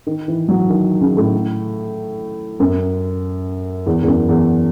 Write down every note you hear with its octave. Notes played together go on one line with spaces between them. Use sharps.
D#3
E3
F#3
D#3
C#3
A2
F#2
E2
E2
F#2
E2